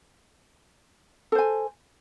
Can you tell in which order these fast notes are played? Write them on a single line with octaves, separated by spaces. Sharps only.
A4 C5 G#5